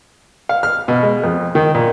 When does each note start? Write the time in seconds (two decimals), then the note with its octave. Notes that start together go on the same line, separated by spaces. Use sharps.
0.49 F5
0.63 F6
0.88 B2
1.03 G#3
1.23 F2
1.55 D#3
1.75 A#2